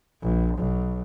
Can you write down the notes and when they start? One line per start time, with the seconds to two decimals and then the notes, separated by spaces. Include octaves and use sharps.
0.22 A#1
0.57 B1